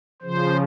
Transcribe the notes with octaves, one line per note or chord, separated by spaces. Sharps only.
C#3 F3 C5